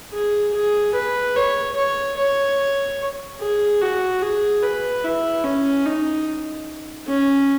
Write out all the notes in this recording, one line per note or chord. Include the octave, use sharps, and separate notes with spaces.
G#4
G#4
B4
C#5
C#5
C#5
G#4
F#4
G#4
B4
E4
C#4
D#4
C#4